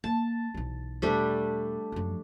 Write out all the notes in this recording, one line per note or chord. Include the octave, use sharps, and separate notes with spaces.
A#3 A5
B1 E3
E2 B2 G3 A3 D4
F#2 F3